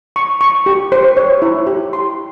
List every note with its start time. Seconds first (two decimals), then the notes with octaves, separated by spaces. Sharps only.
0.16 C#6
0.41 C#6
0.66 G4
0.92 C5
1.17 C#5
1.42 E4
1.67 G4
1.93 C6